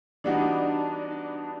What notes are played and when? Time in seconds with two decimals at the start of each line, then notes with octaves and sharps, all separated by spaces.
0.24 E3 G3 B3 D4 D#4 F#4
1.07 D4